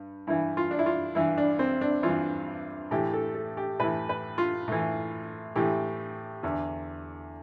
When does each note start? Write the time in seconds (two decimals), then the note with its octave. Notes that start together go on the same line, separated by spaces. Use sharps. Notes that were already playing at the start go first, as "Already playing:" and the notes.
Already playing: G2
0.27 G2 E3 E4
0.57 F4
0.71 D4
0.79 E4
0.86 F4
1.15 G2 E3 E4
1.38 D4
1.59 C4
1.81 D4
2.03 G2 E3 F4
2.91 A2 E3 G4
3.14 A4
3.35 A4
3.57 G4
3.80 A2 E3 B4
4.09 B4
4.38 F4
4.68 A2 E3
5.56 A2 E3 G4
6.43 E2 D3